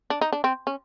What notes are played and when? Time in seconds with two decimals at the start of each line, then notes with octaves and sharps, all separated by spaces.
0.10 D4
0.21 D#4
0.32 D4
0.44 C4
0.67 C#4